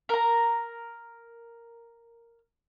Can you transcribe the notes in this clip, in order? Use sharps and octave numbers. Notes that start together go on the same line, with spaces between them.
A#4 A#5